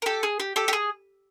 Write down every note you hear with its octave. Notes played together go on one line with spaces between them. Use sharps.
A#4
G4 A4
G#4
G4
G4 A4
G4
G#4